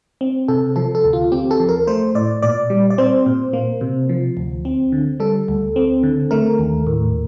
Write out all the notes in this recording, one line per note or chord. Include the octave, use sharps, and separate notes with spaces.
C4
C3 A4
F3 A4
A4
D2
F4
C4 G4
A4
F3
A#4
A3 C5
A2 D5
A#2 D5
G3
D5
C4 C5
A#2
A#3
C3
F3
D2
C4
D3
G3 A4
D2
C4
D3
A3 A#4
D#2
A2